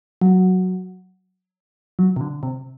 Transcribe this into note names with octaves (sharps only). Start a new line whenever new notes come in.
F#3
F#3
C3
D3
C3